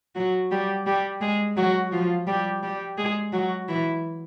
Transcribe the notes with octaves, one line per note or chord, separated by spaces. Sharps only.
F#3 F#4
G3 G4
G3 G4
G#3 G#4
F#3 F#4
F3 F4
G3 G4
G3 G4
G#3 G#4
F#3 F#4
E3 E4